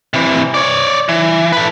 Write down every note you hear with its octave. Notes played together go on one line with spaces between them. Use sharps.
C3 E3
C#5 D5
E3
A4 B4